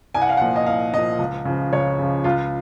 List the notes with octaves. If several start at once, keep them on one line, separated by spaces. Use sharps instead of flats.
C2 G#5
F#5
F5
A#2 F3 F#5
D#5
C2 F5
A#2 F3 D#5
C#2
C#3 F3
C#2 C#5
C#3 F3
C#2 F4